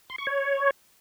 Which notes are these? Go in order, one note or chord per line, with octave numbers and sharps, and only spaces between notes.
C6
C#6
C#5